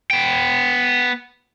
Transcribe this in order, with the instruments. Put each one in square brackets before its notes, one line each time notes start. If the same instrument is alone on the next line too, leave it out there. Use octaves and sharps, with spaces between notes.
[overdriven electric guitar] B3 G5